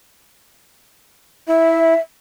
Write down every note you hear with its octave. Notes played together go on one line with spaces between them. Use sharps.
E4 E5